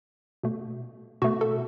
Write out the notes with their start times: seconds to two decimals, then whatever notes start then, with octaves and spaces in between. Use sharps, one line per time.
0.43 B2 A3
1.22 B2 A3 F#4
1.41 A4